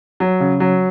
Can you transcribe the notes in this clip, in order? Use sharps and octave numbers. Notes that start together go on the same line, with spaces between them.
F#3
C#3
F#3